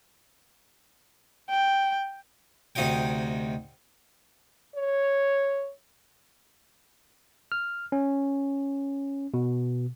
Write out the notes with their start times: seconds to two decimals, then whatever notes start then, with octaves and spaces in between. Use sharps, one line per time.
1.50 G5
2.75 D2 C3 D#4 D#5 G5
4.75 C#5
7.52 F6
7.92 C#4
9.34 B2